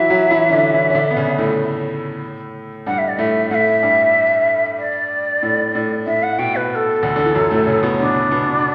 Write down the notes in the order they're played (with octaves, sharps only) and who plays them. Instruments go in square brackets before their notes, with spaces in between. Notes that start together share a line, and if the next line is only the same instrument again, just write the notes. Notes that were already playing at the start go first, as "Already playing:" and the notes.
Already playing: [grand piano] E3 F#3 E4 F#4 [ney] E5
[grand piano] F#3 F#4
F#4
E3 E4
C#4
D3 D4
E3 E4
C#4
D3 D4
B3
C#3 C#4
A2 A3
[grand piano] G2 G3 [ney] F#5
[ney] E5
D5
[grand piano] A2 A3 [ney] E5
[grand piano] A2 A3 [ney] E5 F#5
[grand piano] G2 G3
[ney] D5
[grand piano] A2
A2
[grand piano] A2 [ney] E5
[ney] F#5
[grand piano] B2 [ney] G5
[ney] B4
B4
A4
[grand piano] D2 D3
D3
E3
F#2 F#3
A2 A3
C#3 C#4
B2 B3
[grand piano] C#3 C#4 [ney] D4
[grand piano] B2 B3